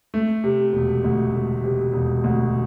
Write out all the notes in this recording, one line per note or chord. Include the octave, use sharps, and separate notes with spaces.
A3
C3
E1
D2
A3
C3
E1
D2